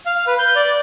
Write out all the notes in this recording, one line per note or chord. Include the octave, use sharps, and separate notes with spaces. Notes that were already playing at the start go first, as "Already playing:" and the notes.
F5
B4
G6
D5